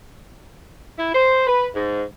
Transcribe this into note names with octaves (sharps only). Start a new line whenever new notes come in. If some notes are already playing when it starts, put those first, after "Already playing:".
E4
C5
B4
G#2